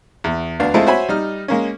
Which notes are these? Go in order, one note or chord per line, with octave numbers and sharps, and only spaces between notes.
E2
D2 B3 D4 F5
G#3 A3 C4 E4 F4 A4
F#4 C5 C#5 E5 G#5 B5
G3 D#4 F6
G#3 A#3 C#4